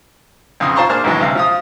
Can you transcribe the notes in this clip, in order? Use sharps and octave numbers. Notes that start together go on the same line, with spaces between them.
B1 F2 C#3 C6 D#6
F4 C5 A5 A#5 C6 C#6
A#3 D4 G#4 C5 F6
A#1 D#2 B2 E3 F#3 G#3
D2 C3 F5
F3 F4 D#6